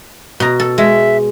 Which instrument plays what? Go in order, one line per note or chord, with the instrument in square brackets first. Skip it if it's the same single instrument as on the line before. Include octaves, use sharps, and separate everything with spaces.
[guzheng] B2 A#5
A4
[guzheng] G#3 [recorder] E5